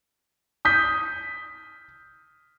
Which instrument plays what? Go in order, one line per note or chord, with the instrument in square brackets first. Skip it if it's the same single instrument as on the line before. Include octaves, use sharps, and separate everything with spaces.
[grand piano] D#6 G6 B6